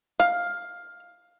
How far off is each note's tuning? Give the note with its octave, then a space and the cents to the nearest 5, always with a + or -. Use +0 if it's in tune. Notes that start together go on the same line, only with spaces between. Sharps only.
F5 +10